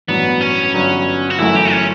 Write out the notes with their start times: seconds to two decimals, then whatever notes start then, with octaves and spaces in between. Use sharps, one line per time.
0.08 A1 G2 F#3 B3
0.41 C#4
0.74 G1 G2 F#3
1.30 F#4
1.39 G1 F#2 E3 A3 E4
1.55 G4
1.72 C#4